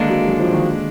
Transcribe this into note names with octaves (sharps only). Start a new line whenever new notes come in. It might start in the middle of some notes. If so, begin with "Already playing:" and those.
Already playing: D#2 D3 G#3 A#3 D4
F#3
F#3
F3
D#3